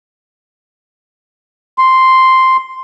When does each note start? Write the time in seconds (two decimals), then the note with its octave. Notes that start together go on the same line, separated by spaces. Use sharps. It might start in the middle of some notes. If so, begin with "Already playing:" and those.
1.78 C6